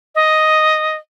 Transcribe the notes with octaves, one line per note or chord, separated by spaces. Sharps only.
D#5